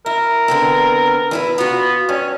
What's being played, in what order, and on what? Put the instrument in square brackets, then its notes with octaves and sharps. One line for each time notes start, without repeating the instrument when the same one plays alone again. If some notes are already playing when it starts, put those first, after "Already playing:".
[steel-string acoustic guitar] E4 [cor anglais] A#4
[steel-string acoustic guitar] D3 B3 C4
E2 E4 B4
[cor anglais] B3 [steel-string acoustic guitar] F4 F#4
[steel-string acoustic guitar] G2 [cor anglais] C#4